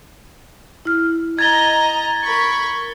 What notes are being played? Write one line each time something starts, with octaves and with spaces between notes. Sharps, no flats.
E4 F6
D#5 A#5 G#6 A6 G7
A#4 B5 C#6